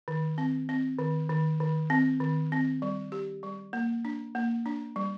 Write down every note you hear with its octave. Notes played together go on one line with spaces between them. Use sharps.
D#3
C4
C4
D#3
D#3
D#3
C4
D#3
C4
G3
G4
G3
A#3
D4
A#3
D4
G3